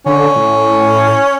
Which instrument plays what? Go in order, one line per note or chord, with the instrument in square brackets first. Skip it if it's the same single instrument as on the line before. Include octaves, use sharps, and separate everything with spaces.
[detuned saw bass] D3 [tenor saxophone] C#4
[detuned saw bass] A2